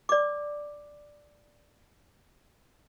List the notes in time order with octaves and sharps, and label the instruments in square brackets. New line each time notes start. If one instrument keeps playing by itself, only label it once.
[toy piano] D5 D6